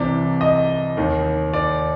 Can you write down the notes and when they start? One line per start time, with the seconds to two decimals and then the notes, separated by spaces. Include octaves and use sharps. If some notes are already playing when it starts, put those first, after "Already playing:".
Already playing: C2 C3 E3 D5
0.41 D#5
0.97 D#2 D#3
1.53 D5